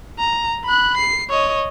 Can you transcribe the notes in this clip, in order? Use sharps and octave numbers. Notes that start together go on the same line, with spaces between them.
A#5
B5 F#6
C7
C#5 D#5